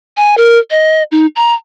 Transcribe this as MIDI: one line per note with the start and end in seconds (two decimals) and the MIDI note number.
0.17 0.35 80
0.37 0.59 70
0.71 1.03 75
1.12 1.26 63
1.36 1.54 82